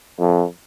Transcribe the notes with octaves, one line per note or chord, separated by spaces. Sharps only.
F2